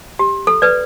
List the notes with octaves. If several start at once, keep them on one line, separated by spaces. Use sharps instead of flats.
G4
A4
B4 D5